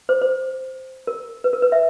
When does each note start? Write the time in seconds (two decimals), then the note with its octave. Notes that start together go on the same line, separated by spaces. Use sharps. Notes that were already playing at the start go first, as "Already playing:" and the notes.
0.09 C5
0.22 C5
1.07 A#4
1.44 B4
1.53 A#4
1.62 B4
1.72 E5